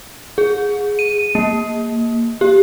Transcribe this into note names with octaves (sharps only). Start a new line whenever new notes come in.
G#4
D#7
A#3
G4